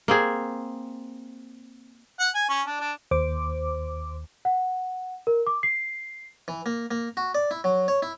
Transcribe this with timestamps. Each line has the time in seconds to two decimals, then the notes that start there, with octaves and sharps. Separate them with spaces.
0.08 A#3 C4 G#4
2.19 F#5
2.34 G#5
2.49 C#4
2.66 D4
2.80 D4
3.11 D#2 C5 D6
4.45 F#5
5.27 A#4
5.47 D6
5.63 C7
6.48 E3
6.66 A#3
6.91 A#3
7.17 F#4
7.35 D5
7.51 E4
7.64 F#3
7.88 C#5
8.02 E4